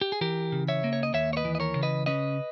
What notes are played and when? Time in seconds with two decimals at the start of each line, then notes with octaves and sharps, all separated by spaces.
0.01 G4
0.12 G#4
0.21 E3 G4 A#4
0.52 C#3
0.68 C#5 E5
0.84 A#3
0.93 C#5
1.03 D#5
1.13 D#2 C#5 E5
1.33 C#5
1.37 B4 D#5
1.45 E3
1.55 D#5
1.60 A#4 C#5
1.76 C#3
1.83 B4 D#5
2.06 C#4 B4 D#5